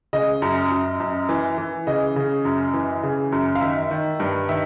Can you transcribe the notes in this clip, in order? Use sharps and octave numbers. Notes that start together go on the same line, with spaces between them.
C#3 D#5
F#2
F#2
F#2
E3
E3
C#3 D#5
C#3
F#2
E3
C#3
F#2
F5
D#3 E5
D#3
G2
D#3 E5